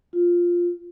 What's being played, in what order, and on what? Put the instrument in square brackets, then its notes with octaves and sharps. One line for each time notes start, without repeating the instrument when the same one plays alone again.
[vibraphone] F4